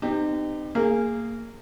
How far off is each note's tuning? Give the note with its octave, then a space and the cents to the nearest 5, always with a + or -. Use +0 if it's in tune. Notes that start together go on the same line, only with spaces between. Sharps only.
C4 -40 D#4 -30 G4 +10
A#3 -20 G#4 -10